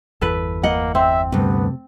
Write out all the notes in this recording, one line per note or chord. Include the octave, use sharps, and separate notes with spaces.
G1 E2 A4 B4
A#3 D#5 F#5
C4 E5
D2 G2 C3 B3